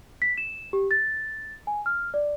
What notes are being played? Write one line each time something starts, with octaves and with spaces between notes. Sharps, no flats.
B6
E7
G4
A6
G#5
F6
D5